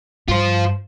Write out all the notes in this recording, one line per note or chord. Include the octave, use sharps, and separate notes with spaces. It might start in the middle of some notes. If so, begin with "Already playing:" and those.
G2 F4 C5